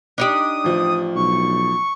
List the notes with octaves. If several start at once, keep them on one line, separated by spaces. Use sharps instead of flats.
D4 D#4 G4 D#6
A1 F3
B1 C#6